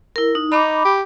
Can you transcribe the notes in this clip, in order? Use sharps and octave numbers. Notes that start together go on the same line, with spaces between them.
E4 A#4
D#4
D#4 B5 D6
G4